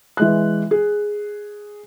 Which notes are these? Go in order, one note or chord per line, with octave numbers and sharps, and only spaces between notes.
E3 G#3 F#6
G#4